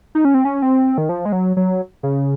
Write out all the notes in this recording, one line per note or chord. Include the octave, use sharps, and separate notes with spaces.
D#4
C#4
C4
C#4
C4
D#3
F3
G#3
F#3
F#3
C#3